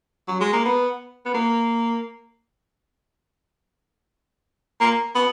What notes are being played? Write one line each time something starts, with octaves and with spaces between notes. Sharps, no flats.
F#3
G#3
A#3
B3
B3
A#3
A#3
B3